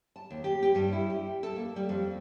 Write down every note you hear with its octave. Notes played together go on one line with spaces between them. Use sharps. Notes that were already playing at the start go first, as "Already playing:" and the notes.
A5
D#2
G4
G4
G2
E4
G4
A4
A#3
G3
F2